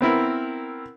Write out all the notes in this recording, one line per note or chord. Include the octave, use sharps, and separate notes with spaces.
B3 C4 E4 A#4